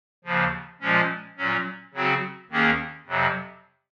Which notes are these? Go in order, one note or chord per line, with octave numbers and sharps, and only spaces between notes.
D#2 C#3 F3
A#2 F3 G#3 C#4
A#2 F#3 C#4
C#3 F#3 C4 F#4
D#2 D#3 A#3 C#4 G#4
F2 C3 F#3